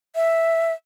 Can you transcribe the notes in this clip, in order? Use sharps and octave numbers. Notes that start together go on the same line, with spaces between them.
E5